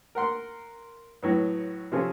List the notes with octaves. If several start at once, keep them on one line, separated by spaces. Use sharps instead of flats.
A#4 F#5 C6
A2 F#3 B3
C3 F3 C#4 G#4 A4